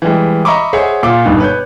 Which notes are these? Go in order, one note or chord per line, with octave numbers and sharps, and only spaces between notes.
E3 G3 G#3
D#5 E5 A#5 B5 C#6 D6
G#4 C5 C#5 E5 F#5
A#2 F4 D6
G1 G2 B2 D#3
B4 C#5 G6